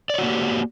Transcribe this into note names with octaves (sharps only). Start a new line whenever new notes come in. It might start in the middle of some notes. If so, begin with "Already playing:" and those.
A#3 F#4 G4 C#5 D5